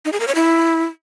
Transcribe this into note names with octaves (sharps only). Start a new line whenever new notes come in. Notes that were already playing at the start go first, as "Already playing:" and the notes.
D#4
G#4
A#4
C#5
E4